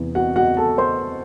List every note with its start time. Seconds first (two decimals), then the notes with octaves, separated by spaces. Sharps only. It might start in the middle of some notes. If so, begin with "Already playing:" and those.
Already playing: E2 C3 E3
0.15 F#4 F#5
0.36 F#4 F#5
0.57 A4 A5
0.78 C5 C6